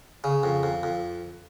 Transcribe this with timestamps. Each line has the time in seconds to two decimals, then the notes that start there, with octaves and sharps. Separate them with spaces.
0.24 C#3
0.43 F2
0.63 F2
0.83 F2